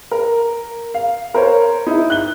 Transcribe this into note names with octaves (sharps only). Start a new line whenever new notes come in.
A#4
F5
A#4 C5 C#5
D#4 E4
F#6 G7